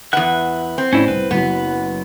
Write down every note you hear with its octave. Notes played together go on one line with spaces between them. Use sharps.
E2 B4 E5 F#5 F#6
C4
A1 C#4 D4 E4
C2 B4
F#1 F#3 B3